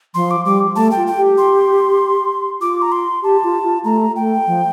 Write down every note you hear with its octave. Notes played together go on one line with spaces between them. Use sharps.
F3 C6
D6
G3 D6
A3 A5
G5
F4
G5
G4
C6
F4 D6
A#5
C6
G4 A5
F4
F4
A3 A#5
A3 G5
F3